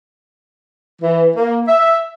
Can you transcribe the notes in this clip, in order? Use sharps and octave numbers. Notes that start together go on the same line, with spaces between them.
E3
A#3
E5